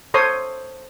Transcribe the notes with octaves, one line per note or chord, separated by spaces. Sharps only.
A4 C5 C#5 C6 D#6